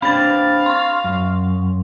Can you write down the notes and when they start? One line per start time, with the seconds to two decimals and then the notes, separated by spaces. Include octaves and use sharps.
0.02 C4 D4 G4 F5 B5 A6
0.66 C6 C#6
1.04 F#2